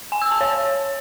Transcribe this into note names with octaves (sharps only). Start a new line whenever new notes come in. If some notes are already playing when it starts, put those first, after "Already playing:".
G#5
E6
A5
C#5